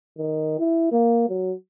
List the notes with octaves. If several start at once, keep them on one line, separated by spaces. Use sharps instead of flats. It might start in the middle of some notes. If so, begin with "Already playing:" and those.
D#3
E4
A#3
F#3